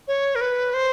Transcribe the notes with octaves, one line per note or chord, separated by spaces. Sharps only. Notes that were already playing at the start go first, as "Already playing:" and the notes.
C#5
A#4
B4
C5